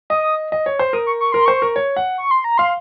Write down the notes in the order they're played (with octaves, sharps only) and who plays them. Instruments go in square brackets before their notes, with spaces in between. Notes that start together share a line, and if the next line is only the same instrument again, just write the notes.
[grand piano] D#5 [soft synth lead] D#6
[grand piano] D#5
C#5
C5
[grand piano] A#4 [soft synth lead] D#6
[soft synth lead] C#6
C#6
[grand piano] A#4 [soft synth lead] C6
[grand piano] C5 [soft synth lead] C#6
[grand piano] A#4
C#5
F#5
[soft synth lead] C#6
C6
A#5
[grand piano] F5 [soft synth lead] C6